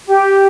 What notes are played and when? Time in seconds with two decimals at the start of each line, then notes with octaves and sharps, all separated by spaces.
0.07 G4